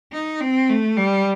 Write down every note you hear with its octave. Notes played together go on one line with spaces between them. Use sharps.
D#4
C4
A3
G3